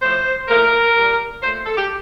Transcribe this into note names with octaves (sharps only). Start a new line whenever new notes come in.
A2 F3 A3 C5
A2 F3 A3 A#4
A#2 G3
A#2 A3 C5
A4
G4